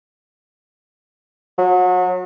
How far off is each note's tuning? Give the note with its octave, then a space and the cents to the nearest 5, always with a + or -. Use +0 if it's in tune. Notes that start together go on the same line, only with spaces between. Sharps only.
F#3 -30